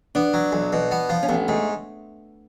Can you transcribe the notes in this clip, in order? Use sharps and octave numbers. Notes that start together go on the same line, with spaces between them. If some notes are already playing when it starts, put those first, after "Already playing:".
B3 D4
F#3
B1
B2
B3
F3
C#4
A1 B3
G#2 A3